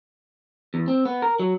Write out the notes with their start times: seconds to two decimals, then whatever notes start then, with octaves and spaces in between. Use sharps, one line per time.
0.74 E2
0.88 C4
1.05 B3
1.22 A#4
1.39 F#3